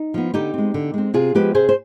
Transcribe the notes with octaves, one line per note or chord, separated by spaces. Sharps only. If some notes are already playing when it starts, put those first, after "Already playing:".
Already playing: D#4
F3 B3
D3 D#4 G4
G#3 C4
D3
G#3 C4
C3 F4 G#4
F3 G#3 B3 G4 B4
C3 G#4 C5
C5